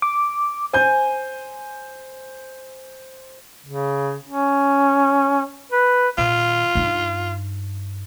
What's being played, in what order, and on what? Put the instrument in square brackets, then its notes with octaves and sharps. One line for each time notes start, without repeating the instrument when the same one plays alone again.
[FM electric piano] D6
[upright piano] C5 G6 [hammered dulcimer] G#5
[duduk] C#3
C#4
B4
[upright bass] A#2 D#3 [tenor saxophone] F4
[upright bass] G2 D#4